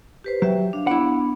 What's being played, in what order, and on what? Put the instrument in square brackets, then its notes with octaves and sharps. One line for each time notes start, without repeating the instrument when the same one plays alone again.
[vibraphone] G4 B4 C5
[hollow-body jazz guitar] F#3 [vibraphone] G4 E5 G5
[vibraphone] D4 F5
[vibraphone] B3 D4 B5 [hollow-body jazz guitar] E4 F#5